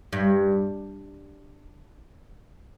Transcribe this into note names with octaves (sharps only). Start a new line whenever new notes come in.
G2